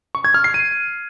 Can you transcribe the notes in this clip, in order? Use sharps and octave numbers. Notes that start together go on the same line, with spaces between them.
C#6
G#6
F6
C7
D#7